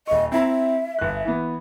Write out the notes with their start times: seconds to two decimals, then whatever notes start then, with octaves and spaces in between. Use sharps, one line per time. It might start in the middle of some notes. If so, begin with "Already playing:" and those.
0.07 D#1 D#5 C#6
0.32 C4 E4 E5 A#5
0.99 G1 F#6
1.25 E3 B3